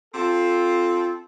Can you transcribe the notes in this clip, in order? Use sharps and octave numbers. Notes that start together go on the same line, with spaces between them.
C4 F4 A4